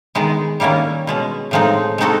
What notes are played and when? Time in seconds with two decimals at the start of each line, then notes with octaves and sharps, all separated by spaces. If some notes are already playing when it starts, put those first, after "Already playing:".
0.15 D#3 G#3 B3
0.60 D#3 G3 A#3 C#4 E4
1.07 B2 G#3 C#4
1.51 A2 F3 G#3 C4 D#4
1.98 G#3 C4 D#4 F#4 A4